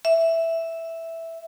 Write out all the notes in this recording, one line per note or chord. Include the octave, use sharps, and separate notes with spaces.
E5